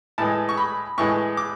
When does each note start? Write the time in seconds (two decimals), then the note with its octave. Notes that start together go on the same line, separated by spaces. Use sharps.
0.18 A2 E3 G#3 A5
0.49 C#6
0.57 B5
0.98 A2 E3 G#3 C#6
1.37 D6